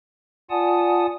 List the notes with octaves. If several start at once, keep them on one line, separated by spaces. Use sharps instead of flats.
F4 D5 F#5 G#5 A5 D#6